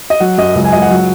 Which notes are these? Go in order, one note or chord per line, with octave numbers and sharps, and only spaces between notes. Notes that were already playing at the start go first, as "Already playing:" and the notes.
D#5
F#3 F#5
F#2 D#5
C#2
G#5
C#2 D#5
F#5
F#3